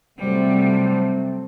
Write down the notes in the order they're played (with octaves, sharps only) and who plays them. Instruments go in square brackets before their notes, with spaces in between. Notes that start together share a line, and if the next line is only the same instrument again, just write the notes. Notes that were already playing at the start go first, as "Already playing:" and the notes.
[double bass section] C3 F#3 A3 C4 [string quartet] G3